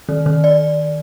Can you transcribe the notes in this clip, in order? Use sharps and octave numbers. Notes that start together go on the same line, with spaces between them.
D#3
D#3
D5